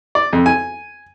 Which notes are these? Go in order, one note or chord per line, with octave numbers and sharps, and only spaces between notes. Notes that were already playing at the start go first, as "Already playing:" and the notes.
D5
F2
G#5